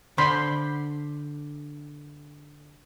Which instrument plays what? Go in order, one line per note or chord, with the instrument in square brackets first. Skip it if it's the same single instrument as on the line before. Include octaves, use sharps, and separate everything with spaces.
[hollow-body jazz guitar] D3 [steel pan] C5 B5 C6